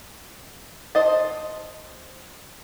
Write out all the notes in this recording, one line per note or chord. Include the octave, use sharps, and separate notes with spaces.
C5 D#5 A5